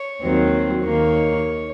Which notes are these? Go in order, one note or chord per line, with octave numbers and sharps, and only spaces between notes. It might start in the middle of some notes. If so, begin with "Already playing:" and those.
Already playing: C#5
D#2 D#3 F#3 C4
D#2 D#3 A#3 C#5